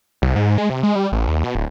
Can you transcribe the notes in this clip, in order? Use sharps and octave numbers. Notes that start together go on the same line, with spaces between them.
C2
G#2
G#3
C3
G#3
G3
A1
D#2
B2
D1